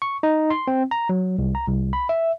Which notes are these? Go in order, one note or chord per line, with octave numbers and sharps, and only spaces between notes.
C#6
D#4
C6
C4
A#5
F#3
C2
A#5
C2
B5
E5